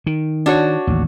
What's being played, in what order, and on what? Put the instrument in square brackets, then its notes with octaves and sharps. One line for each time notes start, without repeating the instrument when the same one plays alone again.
[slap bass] D#3
[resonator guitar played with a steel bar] D4 F#4 C#5
[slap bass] A1 D#2